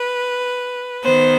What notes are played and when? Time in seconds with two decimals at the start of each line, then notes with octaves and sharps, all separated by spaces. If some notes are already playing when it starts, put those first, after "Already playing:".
Already playing: B4
1.03 D#3 B3 C5